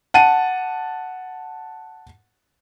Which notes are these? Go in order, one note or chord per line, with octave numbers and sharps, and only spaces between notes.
F#5 A5 D#7